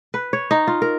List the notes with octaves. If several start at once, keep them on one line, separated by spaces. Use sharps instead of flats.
B4
C#5
D#4
F4
A#4